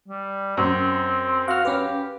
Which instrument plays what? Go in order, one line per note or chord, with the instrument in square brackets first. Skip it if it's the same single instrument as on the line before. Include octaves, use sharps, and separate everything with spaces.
[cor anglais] G3
[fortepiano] F#2 [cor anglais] C4
[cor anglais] F#4 [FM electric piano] F5 F6
[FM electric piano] C#4 B4 [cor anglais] G4